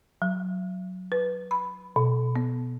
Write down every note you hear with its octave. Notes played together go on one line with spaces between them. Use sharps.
F#3
B4
B5
B2
B3